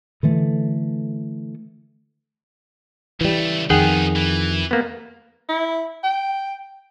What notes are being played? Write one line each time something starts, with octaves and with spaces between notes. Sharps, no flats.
D3 E3 A3
C#2 E3 G3 A3
F2 D#3 B3 D#4 G#4 F#5 G5
E3
A#3 B3
E4
G5